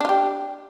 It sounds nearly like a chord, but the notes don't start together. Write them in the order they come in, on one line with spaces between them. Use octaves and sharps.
D4 F4 G4